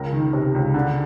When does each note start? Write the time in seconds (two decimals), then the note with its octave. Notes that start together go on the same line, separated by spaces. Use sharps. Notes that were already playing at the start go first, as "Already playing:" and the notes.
Already playing: C#2 A#4 A#5
0.13 D#3
0.33 C3
0.54 C#2
0.74 D3